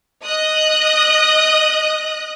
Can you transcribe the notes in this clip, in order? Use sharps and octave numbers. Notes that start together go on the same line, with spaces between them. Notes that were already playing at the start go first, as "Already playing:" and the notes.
D#5 D#6 F#6